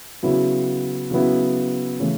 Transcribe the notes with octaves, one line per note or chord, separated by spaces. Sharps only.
C#3 F#3 B3 E4
C#3 F#3 B3 E4
C#3 E3 A3 C#4